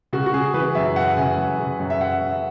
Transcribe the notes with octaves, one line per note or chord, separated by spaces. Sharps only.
C#3 F#4
F#4
C#3 G#4
E3 B4
F#2 E5
F#2 F#5
C#3 G#5
F#2
C#3
F#2
E5
F#2 F#5
F#2